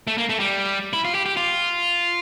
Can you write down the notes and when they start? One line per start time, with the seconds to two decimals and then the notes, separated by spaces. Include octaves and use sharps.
0.07 A3
0.18 A#3
0.29 A3
0.40 G3
0.93 E4
1.05 F4
1.15 G4
1.26 G4
1.37 F4